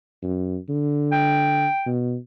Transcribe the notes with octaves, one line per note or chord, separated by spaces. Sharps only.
F#2
D3
G5
B2